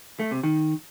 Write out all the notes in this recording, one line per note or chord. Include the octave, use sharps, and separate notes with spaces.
A3
C3
D#3